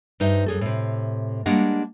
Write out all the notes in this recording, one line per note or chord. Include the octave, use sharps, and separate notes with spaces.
G2 D#4 C5 E5
F#2 G#4 A4
A2 C3
G3 G#3 A#3 D4 C#5 F#5